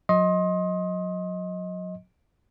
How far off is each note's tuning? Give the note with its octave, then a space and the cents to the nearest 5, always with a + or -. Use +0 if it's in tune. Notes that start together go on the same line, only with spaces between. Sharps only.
F#3 -30 D#5 +15 C6 +30